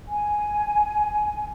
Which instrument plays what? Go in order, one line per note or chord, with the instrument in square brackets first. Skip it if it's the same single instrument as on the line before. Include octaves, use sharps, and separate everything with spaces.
[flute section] G#5